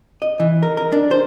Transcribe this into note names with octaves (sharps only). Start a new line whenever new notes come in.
D#5
E3
A#4
A#4
D4
C5